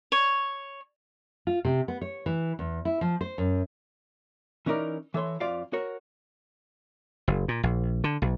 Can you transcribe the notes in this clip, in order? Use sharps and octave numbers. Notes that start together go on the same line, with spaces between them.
C#5
F4
C3
B3
C#5
E3
E2
E4
F3
C5
F#2
E3 C#4 D#4 A#4 D5
E3 A4 C#5 C6
F2 F4 D5 F5
F#4 A#4 C#5
F#1
A#2
A#1
D3
B1